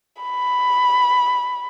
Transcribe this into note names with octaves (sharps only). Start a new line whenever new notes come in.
B5